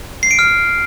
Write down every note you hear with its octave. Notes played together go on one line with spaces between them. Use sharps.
C7
D7
F6